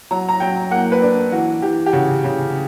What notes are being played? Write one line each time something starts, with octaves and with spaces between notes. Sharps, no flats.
F#3 A#5
A#5
F#3 G5
A#3 F#5
B4
D4
E3 F#4
E3 G4
G4
C#3 F#4
C#3